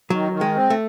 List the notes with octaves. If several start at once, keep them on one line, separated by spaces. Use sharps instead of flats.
D#3 F#3
D#3
G#3
C4
A3